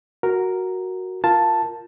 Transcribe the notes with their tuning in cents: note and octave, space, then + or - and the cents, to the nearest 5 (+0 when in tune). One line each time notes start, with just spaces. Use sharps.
F#4 +0 A#4 +0
F4 +0 A#4 +0 A5 +0